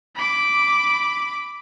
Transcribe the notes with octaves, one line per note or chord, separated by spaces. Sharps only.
B5 D6